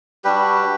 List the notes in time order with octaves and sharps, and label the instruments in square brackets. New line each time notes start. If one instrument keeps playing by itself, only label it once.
[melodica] G3 D4 F#4 G4 B4